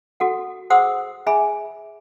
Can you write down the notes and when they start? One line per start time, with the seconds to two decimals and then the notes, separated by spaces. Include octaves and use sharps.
0.20 F#4 A4 F#5
0.70 G#4 C5 F#5 C6 D#6 E6
1.27 G#4 E5 G#5 B5